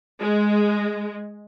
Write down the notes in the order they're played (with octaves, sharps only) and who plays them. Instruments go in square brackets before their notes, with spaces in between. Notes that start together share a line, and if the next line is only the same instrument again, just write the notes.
[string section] G#3